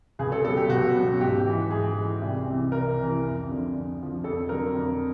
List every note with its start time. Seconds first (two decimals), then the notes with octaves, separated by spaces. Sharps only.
0.19 C#2 G#4
0.32 A4
0.44 B2 A4
0.48 F#3
0.57 G4
0.69 C#2 F#4
0.95 B2 F#3
1.20 G#2 G4
1.46 E3
1.71 G#2 G#4
1.97 E3
2.21 C2
2.47 C3 E3
2.72 C2 A#4
2.98 C3 E3
3.23 F2
3.48 D3 F3
3.73 F2
3.99 D3 F3
4.24 F2 A4
4.49 D3 F#3 A#4
4.74 F2